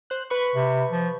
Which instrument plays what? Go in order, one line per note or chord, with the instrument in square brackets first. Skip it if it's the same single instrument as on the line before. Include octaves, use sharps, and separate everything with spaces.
[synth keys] C5 F#6
B4 B5 C#6
[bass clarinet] C3
F3